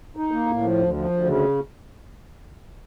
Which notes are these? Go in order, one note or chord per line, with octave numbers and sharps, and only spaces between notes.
D#4
A#3
A2
F3
D2
F3
D2
C#3